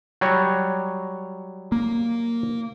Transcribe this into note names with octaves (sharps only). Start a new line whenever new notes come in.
F#3 G3 C#5
A#3